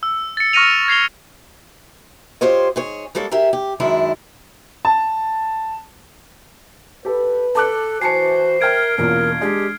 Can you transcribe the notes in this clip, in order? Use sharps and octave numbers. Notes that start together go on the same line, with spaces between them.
E6
A6 C#7
C#6 F6 A#6 C#7 D#7 F7
G#6 C7 F7 G7
F4 G4 C5 C#5 D#5
G#2 G#4 C#5
G3 G#3 A#3 A4 C#5
G4 G#4 A#4 E5
G4
F#2 D#3 G#3 D4 E4
A5
G4 A4 B4
A4 A5 D6 F#6
E3 F#4 C5 G#5 A5 C7 C#7
A#4 E5 G5 F6 G#6 D7
E2 B2 A#3 C#4 F4 A#4
G#3 D4 G4